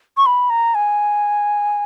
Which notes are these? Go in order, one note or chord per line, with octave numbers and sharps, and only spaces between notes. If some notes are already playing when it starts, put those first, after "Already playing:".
C#6
B5
A#5
G#5